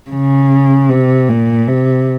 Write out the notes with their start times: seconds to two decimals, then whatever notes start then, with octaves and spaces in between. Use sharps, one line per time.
0.11 C#3
0.89 C3
1.28 A#2
1.67 C3